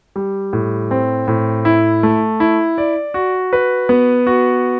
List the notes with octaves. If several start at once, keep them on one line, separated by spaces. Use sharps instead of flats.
G3
A2
C4
A2
E4
A3
E4
D5
F#4
B4
B3
F#4